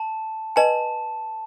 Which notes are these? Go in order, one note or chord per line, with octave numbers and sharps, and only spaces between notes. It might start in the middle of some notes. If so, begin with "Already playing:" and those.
Already playing: A5
B4 D#5 G#5 A5